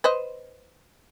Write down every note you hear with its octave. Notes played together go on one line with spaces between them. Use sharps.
B4 C5 D#5